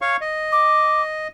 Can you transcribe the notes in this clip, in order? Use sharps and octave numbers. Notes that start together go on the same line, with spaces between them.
C#5 F5 C#6
D#5
D6